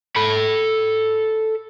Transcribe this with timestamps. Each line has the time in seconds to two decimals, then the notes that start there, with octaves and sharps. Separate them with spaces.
0.16 A4 B5